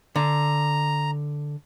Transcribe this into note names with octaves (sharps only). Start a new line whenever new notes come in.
D3 A#5